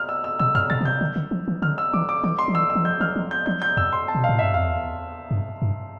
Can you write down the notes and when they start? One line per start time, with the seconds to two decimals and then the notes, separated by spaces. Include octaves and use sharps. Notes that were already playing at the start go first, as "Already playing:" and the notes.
Already playing: F6
0.09 E6
0.24 E6
0.39 B2 E6
0.55 G2 F6
0.70 B2 A6
0.81 D3
0.85 C3 G6
1.01 D3
1.16 D3
1.31 F3
1.48 E3
1.62 D3 F6
1.78 E6
1.93 E3 D6
2.09 D6
2.24 E3 D6
2.39 C6
2.48 F3
2.55 E3 E6
2.70 E6
2.75 E3
2.85 F3 G6
3.00 E3 F6
3.16 F3
3.31 G6
3.46 F3 G6
3.62 G6
3.77 F2 E6
3.93 C6
4.08 A5
4.15 B2
4.24 F5
4.29 A2
4.39 G2 E5
4.54 F2 F5
4.69 E2
5.31 G2
5.62 G2